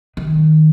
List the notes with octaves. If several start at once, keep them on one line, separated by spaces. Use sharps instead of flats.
D#3